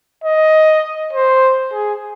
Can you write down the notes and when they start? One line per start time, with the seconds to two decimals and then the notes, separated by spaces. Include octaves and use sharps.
0.23 D#5
1.13 C5
1.72 G#4